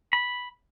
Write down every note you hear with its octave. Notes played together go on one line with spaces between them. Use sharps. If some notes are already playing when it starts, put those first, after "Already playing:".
B5